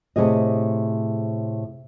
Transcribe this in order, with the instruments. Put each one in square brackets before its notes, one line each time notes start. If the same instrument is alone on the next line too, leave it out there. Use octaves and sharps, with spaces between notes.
[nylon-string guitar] A2 C3 G#4 D#5